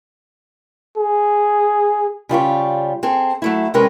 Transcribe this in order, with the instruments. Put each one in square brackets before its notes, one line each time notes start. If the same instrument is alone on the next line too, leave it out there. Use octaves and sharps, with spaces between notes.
[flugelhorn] G#4
[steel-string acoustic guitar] C#3 G3 F4 C#5
C4 G#4 A4
F#3 A3 E4
C3 G3 G#3 C#4 A#4 B4